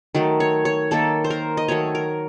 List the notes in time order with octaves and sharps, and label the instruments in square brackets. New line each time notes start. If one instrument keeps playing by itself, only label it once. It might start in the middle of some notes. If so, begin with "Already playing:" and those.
[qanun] D#3 F#3 A3
C#5
C#5
D#3 A#3 A4
C5
A#4
D#5
D#3 F#3 A3 C#5
A#4